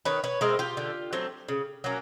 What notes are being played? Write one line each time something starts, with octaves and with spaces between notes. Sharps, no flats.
D#3 B4 C#5
B4 C#5
G#3 C4 E4 A#4 C5
F4 G4
D3
F#3 A3 C4
C#3
F#3 A#3 C#4